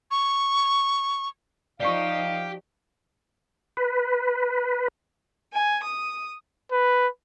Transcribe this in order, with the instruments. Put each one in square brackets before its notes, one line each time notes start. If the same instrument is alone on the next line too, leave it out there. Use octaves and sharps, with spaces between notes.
[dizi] C#6
[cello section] F3 D#4 [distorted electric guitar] G4 [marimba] D5 C#6 [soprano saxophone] F5
[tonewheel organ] B4
[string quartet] G#5
D#6
[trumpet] B4